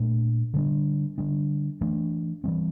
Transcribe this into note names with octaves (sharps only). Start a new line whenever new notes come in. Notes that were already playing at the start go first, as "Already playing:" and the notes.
Already playing: A#2 A3 D4
D3 G3 D4
D3 G3 D4
E3 A3 D4
E3 G3 C4